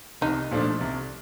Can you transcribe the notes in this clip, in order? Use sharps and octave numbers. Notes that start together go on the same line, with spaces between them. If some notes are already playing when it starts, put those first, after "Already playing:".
C2 D#4
A#2 F3 A3 D4
C2